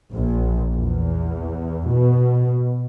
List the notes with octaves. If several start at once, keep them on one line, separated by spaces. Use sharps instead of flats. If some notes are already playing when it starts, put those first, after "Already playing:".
A#1
E2
B2